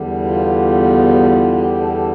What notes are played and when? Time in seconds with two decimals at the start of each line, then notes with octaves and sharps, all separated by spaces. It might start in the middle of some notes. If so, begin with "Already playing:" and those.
Already playing: E2 D3 G3 B3
0.25 F4
1.52 G4
1.80 A4
1.87 G4
1.94 A4